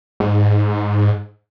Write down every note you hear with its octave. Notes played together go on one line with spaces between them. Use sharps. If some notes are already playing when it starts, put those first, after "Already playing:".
G#2